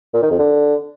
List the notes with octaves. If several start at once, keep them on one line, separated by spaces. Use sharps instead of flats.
A#2
D#3
F2
D3